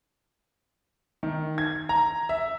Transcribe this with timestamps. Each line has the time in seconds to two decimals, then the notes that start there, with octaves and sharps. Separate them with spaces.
1.23 D#3
1.58 G#6
1.89 A#5
2.29 E5